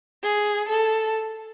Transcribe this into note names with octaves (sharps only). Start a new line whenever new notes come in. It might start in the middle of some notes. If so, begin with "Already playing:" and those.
G#4
A4